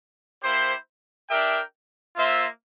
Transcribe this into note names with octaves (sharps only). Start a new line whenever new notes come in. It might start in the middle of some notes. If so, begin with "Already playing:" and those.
A#3 E4 G4 C5
D4 G4 A#4 E5 G5
A#3 F4 C5 E5